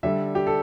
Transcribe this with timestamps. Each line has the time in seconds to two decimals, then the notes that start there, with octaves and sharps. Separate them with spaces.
0.03 D3 G3 E5
0.35 G4
0.47 A4